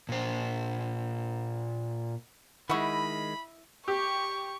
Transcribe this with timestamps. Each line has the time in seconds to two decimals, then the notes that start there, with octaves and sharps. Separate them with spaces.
0.09 A#2 C5
2.70 D#3 G#3 E4 D#5 F#5 B5 C#6
3.88 G4 C#6